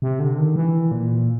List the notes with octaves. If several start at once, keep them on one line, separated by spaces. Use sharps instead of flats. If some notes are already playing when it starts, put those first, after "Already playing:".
C3
D3
D#3
E3
A#2